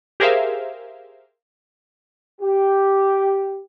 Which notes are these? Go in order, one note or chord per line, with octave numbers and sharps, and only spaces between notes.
G4 G#4 A#4 C5 E5 F5
G4